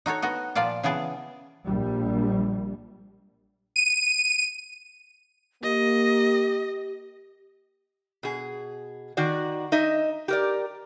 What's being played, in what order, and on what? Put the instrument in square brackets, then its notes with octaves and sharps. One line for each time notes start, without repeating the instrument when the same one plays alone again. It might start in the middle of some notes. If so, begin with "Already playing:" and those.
[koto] D#4 F#4 A4 C#5
B3 F#4 D#5
A#2 F3 F4 D5 A5
C#3 E3 B3 G#4 A5
[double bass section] A#1 G3
[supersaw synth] D#7
[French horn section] A#3 [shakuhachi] G4 [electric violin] D#5
[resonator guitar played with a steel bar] B2 G#4
D#3 F#4 D5
D#4 D#5 E5
G4 A#4 D5